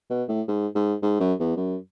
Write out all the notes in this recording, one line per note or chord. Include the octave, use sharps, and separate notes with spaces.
B2
A2
G#2
G#2
G#2
F#2
E2
F#2